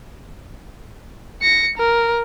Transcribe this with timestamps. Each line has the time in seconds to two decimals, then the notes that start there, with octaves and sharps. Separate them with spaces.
1.42 A#6 C#7
1.78 A#4